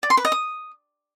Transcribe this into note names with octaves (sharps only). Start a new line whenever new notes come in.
D5
C6
B4
D#5
D#6